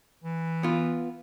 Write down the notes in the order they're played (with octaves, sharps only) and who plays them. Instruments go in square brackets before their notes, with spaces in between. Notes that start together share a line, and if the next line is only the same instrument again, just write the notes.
[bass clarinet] E3
[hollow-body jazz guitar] B3 F4